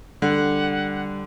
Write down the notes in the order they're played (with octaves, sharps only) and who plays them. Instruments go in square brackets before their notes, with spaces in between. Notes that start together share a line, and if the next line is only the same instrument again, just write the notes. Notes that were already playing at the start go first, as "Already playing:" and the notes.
[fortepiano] D3 [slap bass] G3 [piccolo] F#5